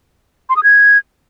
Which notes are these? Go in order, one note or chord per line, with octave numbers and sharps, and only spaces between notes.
C6
D#6
G#6